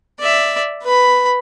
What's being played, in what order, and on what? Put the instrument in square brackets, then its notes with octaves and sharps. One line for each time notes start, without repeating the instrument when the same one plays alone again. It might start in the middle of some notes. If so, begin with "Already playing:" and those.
[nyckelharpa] D5 E5
B4 B5